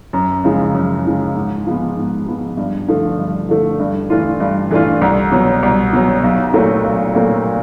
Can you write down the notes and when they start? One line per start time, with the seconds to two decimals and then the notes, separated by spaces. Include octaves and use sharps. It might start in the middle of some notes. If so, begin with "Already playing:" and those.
0.13 F#2
0.44 C#3 F3 G#3
0.74 F#2
1.05 C#3 F3 G#3
1.36 G#2
1.66 F3 G#3 B3
1.97 G#2
2.27 F3 G#3 B3
2.57 G2
2.88 D3 F3 A3
3.19 G2
3.49 D3 F3 A3
3.80 G2
4.10 E3 A3 D4 F4
4.40 G2
4.71 E3 A3 D4 F4
5.01 C2
5.32 B2 F#3
5.63 C2
5.93 B2 F#3
6.24 B1
6.53 A#2 F#3 A3 C4
6.84 B1
7.15 A#2 F#3 A3 C4